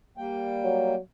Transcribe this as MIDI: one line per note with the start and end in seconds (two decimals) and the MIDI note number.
0.17 0.95 55
0.17 0.95 58
0.17 0.95 79
0.64 0.99 54